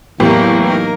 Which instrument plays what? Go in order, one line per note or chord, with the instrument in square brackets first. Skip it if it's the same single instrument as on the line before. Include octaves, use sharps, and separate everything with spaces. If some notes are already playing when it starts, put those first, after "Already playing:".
[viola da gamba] E2 A#4 [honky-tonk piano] A2 E3 G4 [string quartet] F#3 A#3
[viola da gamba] D#4 A#4